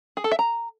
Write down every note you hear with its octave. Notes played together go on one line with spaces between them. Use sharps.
G#4
A4
E5
A#5